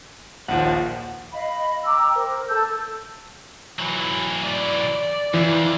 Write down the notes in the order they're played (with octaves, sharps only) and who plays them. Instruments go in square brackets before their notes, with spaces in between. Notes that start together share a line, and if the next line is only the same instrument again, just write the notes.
[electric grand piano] A#1 D#2 F3 [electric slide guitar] F#5
[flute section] D#5 F5 B5
G5 A#5 D6 E6
A#4 C5
A4 A5 E6 G6
[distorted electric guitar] E3 F#3
[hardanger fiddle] D5
[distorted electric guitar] F2 [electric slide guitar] E3